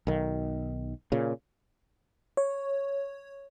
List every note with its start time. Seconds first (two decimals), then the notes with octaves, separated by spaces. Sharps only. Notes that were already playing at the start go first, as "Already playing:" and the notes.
0.07 B1 D#3
1.12 A#2 C#3
2.37 C#5